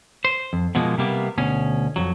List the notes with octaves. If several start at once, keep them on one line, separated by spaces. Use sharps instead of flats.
C5
F2
B2 F3 G#3 A#3
C3 G3 A#3 B3
D2 B2 C#4
F2 F#3